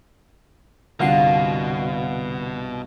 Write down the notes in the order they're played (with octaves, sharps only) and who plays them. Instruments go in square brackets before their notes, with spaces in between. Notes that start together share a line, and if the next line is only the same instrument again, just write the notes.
[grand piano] C2 G2 F4 [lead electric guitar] B2 [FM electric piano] D3 F#5 C7 [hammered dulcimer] F5